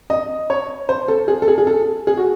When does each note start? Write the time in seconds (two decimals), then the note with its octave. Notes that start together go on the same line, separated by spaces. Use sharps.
0.10 D#5
0.50 C#5
0.89 C5
1.08 A4
1.28 G#4
1.42 A4
1.48 G#4
1.58 G#4
1.67 A4
2.07 G#4
2.17 F#4